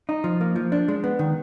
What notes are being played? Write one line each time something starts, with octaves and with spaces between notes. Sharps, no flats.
D#4
F3
A#3
F3
D4
G#3
B3
D#3